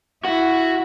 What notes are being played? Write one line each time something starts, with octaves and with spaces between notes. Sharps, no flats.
E4 F#4